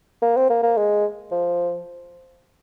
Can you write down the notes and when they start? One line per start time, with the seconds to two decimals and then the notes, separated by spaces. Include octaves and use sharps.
0.22 A#3
0.37 C4
0.50 A#3
0.63 A#3
0.77 G#3
1.32 F3